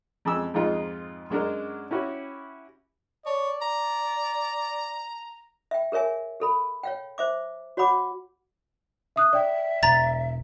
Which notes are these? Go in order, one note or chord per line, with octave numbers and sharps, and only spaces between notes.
F2 G#3 G#5 E6
F2 G#2 G#3 D#4 F4
F#2 G#3 D4 A#4
C#4 E4 F#4 G4
C#5 D5 A5
A#5
E5 G5
G#4 A#4 C#5 E5 G#5
G#4 A4 B5
C#5 F5 G5
C5 E5 D6
F#4 C#5 F#5 B5 D6
E5 D#6 F#6
D5 E5 G5
E1 A#5 A6